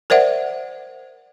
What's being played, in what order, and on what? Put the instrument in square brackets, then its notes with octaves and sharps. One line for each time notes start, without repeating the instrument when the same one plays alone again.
[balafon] A#4 C5 D5 E5 F#5